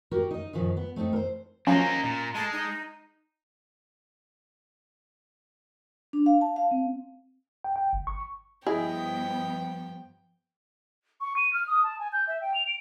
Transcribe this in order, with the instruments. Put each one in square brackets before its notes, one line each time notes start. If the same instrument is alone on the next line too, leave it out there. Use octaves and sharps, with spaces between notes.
[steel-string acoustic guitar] F#4 G4 A#4
D#4 D#5
F#2 A#2 D#3 F3
B3
A3 C4 D4 D#4
A#4 C5
[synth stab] F3 F#3 C#4 [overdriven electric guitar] A#3 D#4 [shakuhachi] A#5
[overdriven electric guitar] A#2
[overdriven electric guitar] G#3 [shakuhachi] A5
[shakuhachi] D#4
[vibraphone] D4
F5
A5
F5
C4
[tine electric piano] G5
G5
G1
C#6
[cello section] G2 F3 B3 [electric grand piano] E4 D#5 [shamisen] G#4 [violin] G5
[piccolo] C#6
D#7
F6
D#6
A5
G#5
G6
E5
G5
F7
D7